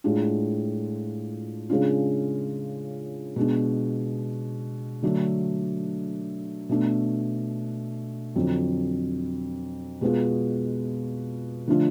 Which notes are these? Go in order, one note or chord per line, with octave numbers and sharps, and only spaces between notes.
A2 G#3 D4 F4
C#3 G#3 D4 F4
B2 G#3 D4
D3 F#3 A3 D4
B2 A3 D4
F2 D3 F#3
B2 G#3 B3 F4
D3 F3 A3 D4 F4